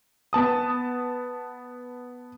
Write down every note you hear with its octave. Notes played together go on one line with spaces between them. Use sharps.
B3 A5 D#6